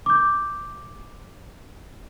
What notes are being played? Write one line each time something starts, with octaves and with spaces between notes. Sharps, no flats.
D6 G6